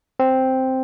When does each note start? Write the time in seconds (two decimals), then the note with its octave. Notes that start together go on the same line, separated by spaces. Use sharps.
0.20 C4